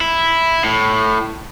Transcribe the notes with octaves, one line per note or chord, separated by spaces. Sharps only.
E4
A2